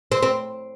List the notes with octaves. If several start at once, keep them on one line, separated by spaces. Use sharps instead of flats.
C4
C4